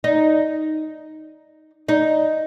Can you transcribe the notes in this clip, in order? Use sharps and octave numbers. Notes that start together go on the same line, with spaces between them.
D#4
D#4